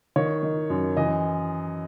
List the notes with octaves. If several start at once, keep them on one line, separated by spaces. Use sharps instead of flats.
D#3 C#5
D#3
F#2
E3 D#5